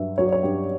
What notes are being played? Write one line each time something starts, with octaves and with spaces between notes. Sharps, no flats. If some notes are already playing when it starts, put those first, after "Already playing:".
Already playing: G2 F#3 E5
F#3 C#5
D5
C#5
G2 G4